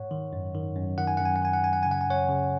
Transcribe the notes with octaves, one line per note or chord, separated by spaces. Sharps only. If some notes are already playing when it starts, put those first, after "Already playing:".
Already playing: G#2 C#5 F#5
D#3
F#2
D#3
F#2
D#3 F#5
G#5
F#2 F#5
G#5
F#5
D#3 G#5
F#5
F#2 G#5
F#5
C#3 G#5
F#5
G#5
F#2 C#5 F#5
C#3